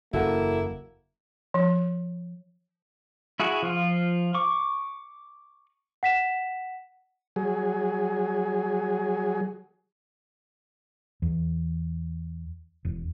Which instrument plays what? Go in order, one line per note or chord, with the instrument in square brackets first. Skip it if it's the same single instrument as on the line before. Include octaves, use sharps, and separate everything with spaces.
[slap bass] F#1 E2 [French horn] A#3 [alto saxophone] E4 [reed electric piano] F#4 A4 F#5
[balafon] F3
[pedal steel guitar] E4 F#4 G#4
F3 F4
C#6 D6
[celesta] F#5 B6 E7
[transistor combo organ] F#3 G#4
[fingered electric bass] E2
E1